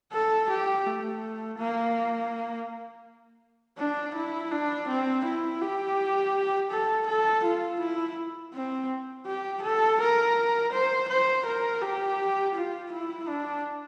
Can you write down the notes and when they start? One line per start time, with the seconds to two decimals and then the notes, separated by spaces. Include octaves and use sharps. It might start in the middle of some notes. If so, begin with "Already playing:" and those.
0.12 A4
0.50 G4
0.86 A3
1.59 A#3
3.78 D4
4.15 E4
4.51 D4
4.88 C4
5.25 E4
5.61 G4
6.71 A4
7.07 A4
7.44 F4
7.80 E4
8.54 C4
9.26 G4
9.62 A4
10.00 A#4
10.73 C5
11.09 C5
11.46 A#4
11.82 G4
12.55 F4
12.92 E4
13.28 D4